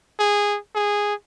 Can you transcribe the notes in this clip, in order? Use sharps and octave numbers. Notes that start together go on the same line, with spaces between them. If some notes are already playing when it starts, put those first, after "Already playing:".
G#4
G#4